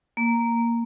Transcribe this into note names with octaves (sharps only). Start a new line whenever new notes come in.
A#3